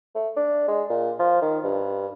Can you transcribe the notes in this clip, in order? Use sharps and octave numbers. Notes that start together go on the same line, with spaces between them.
A3
D4
G#3
A#2
F3
D#3
G2